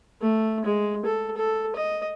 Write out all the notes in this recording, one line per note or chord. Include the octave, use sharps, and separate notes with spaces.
A3
G#3
A4
A4
D#5